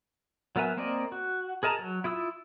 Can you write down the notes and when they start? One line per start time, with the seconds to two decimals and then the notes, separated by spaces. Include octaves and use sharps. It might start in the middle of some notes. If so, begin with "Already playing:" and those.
0.56 F#3 B3 A#4 E5 G#5
0.77 A#3 C4 A#4 D5 D#5
1.12 F#4
1.63 G#4 A#4 D#5 A5 A#5
1.79 F#3
2.04 E4 F4 D#6 E6